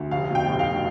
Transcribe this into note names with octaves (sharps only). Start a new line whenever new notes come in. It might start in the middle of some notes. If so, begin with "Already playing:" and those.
Already playing: D2
F1 F5
B2
G5
F1
F5